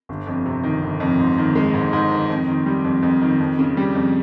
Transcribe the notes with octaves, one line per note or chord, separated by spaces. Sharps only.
G1
F2
C3
D#3
G1
F2
G#2
D#3
G#3
G#2
G#2
D#3
F2
D#3
G3
F2
F2
D#3
F2
C#3
G3
F2